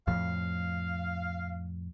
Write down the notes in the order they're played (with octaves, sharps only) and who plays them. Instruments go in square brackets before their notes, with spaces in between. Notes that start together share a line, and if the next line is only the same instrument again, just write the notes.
[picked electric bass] F2 A2 F3 [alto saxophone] F5